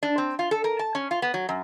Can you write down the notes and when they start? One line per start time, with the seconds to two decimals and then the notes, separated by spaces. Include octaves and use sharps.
0.03 D4
0.18 C4
0.39 F4
0.51 A4
0.64 A#4
0.79 A5
0.95 C#4
1.11 F4
1.22 B3
1.34 F#3
1.49 F#2